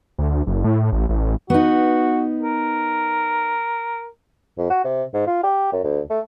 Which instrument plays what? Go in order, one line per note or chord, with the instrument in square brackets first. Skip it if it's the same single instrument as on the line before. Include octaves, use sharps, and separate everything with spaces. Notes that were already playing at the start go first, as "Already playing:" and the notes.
[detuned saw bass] D2
F#1
A2
A1
A1
[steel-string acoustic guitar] B3 D#4 [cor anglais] F#4
[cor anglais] A#4
[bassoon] F2
F#4
C3
G#2
F4
G4
F#2
D2
A3